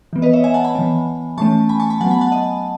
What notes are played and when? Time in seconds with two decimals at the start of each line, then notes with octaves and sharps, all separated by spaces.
0.13 E3 B3
0.22 B4 D#5
0.33 C#5 E5
0.44 E5 G#5
0.54 F#5 A5
0.64 G#5 B5
0.75 E3 B3
1.38 E3 A3 C#4 A5 C#6
1.69 G#5 B5
1.80 A5 C#6
1.90 G#5 B5
2.01 F#3 F#5 A5
2.04 B3
2.11 G#5 B5
2.21 F#5 A5
2.32 D#5 F#5